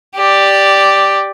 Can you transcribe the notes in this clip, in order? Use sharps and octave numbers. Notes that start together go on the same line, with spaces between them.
G4 D5